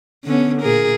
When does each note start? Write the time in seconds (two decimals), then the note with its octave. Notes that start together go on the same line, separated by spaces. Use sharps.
0.24 D3 B3 C#4
0.62 A#2 G#4 A#4